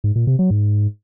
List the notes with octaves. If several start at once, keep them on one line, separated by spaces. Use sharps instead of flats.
G#2
A#2
C3
F#3
G#2